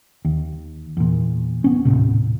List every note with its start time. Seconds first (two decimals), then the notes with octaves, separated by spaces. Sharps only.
0.25 D#2
0.97 E2 A#2
1.64 B3 C#4
1.85 D#1 C2 A2 C3